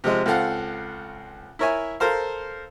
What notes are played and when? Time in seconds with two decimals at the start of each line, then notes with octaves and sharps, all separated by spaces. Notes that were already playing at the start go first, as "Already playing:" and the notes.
0.04 C3 F3 G#3
0.26 C#2 C4 A4 F5 F#5
1.59 E4 A#4 C#5 E5 G#5
2.00 A4 A#4 C5 F5